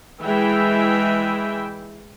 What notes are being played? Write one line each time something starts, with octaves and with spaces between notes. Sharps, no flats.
E3 G#3 E5 G5